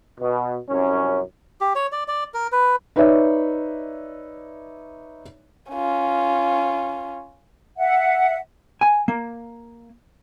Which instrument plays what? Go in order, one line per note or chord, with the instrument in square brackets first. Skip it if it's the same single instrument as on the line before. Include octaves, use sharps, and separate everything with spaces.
[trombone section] B2
C2 F#2 C#4
[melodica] G4
C#5
D5
D5
A#4
B4
[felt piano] D#4 B4 C#5 D5 E5
[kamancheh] C#4 F4
[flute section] E5 F#5
[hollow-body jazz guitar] G#5
A#3